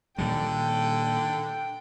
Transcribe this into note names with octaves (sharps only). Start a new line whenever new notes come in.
A#2 D3 D#3 G3 G5